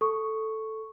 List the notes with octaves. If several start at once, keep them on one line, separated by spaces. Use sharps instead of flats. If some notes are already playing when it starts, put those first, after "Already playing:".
A4 C#6